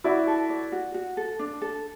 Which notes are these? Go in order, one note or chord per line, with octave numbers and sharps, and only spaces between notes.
E4 F#4 D5
A4
D5
F#4
F#4
A4
D4
A4